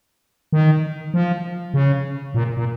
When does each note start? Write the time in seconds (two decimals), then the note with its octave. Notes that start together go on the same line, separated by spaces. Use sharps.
0.53 D#3
1.14 F3
1.74 C#3
2.34 A#2
2.57 A#2